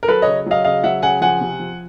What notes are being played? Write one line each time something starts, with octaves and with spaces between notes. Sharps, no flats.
A#4
F#3 A4 B4
C#3 C#5 D#5
F#3 D#5 F5
C#3 D#5 F5
F#3 E5 F#5
C#3 F#5 G#5
F3 F#5 G#5
C3
F3